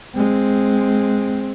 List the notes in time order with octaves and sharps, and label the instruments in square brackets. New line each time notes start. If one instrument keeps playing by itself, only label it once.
[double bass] G#3 C4